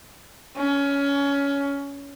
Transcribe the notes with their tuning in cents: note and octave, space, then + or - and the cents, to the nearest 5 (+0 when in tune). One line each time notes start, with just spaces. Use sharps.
C#4 +20